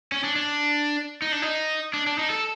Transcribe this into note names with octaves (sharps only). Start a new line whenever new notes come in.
C#4
D4
D4
D#4
D4
D#4
D4
D4
D#4
A4